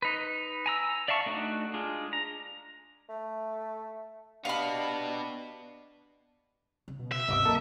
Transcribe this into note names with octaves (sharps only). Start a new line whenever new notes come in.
D#4 B4
G#5 A#5 E6
D5 E5 F5 A5 C#6
A3 D4 D#4 F#4
G#3 D4 F4 G#4
A#5
A3
B3 D4 G4 D#5 F5 B5
C#3
B2
E5
G1 D2 C3 D#5 D6 E6
F#2 C3 A#3 A4 A#4 D#5